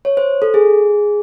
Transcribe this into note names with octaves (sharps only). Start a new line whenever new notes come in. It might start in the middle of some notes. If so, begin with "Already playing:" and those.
C#5
C5
A4
G#4